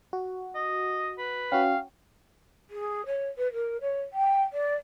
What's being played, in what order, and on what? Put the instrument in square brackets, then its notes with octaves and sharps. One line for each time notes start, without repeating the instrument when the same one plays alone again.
[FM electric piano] F#4
[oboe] D#5
B4
[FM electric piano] C#4 F#4 [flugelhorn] F5 [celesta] G5
[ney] G#4
C#5
B4
A#4
C#5
G5
D5